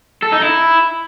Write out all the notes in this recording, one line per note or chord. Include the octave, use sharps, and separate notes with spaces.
A4
D#4
E4